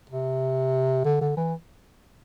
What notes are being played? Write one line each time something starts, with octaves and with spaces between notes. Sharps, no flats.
C3
D3
D3
E3